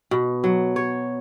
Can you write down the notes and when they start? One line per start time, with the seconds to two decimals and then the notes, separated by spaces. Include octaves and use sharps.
0.11 B2
0.44 F#3
0.76 C#5